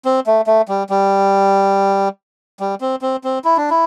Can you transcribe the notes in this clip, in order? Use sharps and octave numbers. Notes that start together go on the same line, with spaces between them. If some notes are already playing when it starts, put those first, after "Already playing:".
C4
A3
A3
G3
G3
G3
C4
C4
C4
E4
D4
E4